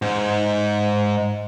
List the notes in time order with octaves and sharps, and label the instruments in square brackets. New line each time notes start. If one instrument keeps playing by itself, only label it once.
[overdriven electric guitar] G#2